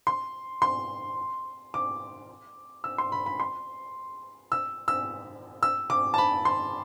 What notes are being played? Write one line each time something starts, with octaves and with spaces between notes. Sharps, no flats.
C6
C6
D6
E6
C6
B5
B5
C6
E6
E6
E6
D6
A5
B5
C6